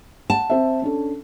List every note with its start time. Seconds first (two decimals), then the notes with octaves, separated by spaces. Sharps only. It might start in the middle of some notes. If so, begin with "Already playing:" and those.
0.30 F#5 A5
0.50 C4 E5
0.82 C#4 D4 A4